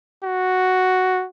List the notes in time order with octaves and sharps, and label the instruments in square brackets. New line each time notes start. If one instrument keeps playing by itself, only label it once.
[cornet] F#4